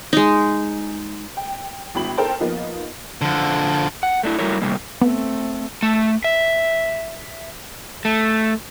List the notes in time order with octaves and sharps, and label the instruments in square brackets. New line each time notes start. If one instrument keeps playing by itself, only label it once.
[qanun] G#3 D#4
[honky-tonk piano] G5
G1 E4 F#4 G5 B5 F#7
D#4 A4 A#4 C5 G5 A5
F3 A#3 B3 D#4 F4
[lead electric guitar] D3 F3
[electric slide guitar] F#5
A3 D4 E4
F#3 G3 A3 E4 A#4 C#5
A2 C3 G3 A#3
[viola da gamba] A3 C4 [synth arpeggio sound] B3
[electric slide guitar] A3
E5
A3